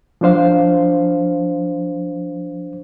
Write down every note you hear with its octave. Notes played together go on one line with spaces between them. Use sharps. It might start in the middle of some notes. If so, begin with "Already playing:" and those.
F3 F#3 D4 C5 F5